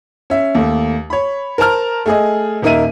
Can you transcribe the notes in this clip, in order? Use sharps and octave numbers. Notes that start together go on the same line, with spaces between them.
C#4 E5
D#2 A3
C#5 B5
A#4 C5 A5 A#5 F6
A3 G#4 D#5
D#1 A#3 D#4 A#4 E5 D#7